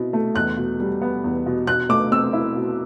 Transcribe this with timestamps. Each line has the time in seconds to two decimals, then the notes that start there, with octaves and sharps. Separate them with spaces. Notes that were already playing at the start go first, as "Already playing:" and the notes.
Already playing: B2 C4 E4
0.13 A3
0.35 E2 F#6
0.57 B2
0.80 G3
1.02 B3
1.24 E2
1.46 B2
1.67 B2 F#6
1.89 A3 D6
2.11 C4 E6
2.33 E4
2.56 B2